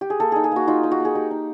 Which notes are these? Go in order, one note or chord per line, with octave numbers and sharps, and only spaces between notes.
G4
G#4
A#3 A4
D#4 G#4
G#4
A#3 F#4
D#4 F4
D#4
F#4
A#3 G#4
D#4 G4
D#4